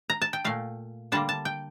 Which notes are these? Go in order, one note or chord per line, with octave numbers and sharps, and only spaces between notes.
A#5
A5
G5
A#2 A3 F5
D3 G3 A#3 A5
A5
G5